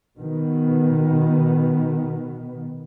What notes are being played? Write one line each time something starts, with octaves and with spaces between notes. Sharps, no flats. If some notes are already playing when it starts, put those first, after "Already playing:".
B2 D#3 B3